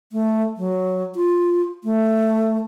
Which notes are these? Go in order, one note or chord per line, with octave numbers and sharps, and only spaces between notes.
A3
F#3
F4
A3